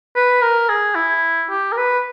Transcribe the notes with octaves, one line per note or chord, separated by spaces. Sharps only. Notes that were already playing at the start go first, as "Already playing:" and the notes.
B4
A#4
G#4
E4
G4
A#4
B4